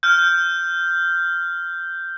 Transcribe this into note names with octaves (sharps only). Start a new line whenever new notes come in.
F6 G6